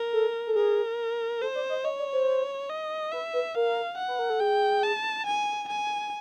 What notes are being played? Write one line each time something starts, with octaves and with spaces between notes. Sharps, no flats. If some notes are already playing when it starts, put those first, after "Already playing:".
Already playing: A#4
A4
A4
G#4 A#4
A4 C5
D5
D#5
C#5 D#5
D5
C5
D#5
B4 E5
B4
A#4 F5
F#5
B4
A#4
A4
G#4 G5
A5
G#5
G#5